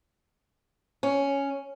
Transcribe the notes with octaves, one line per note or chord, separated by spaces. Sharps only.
C#4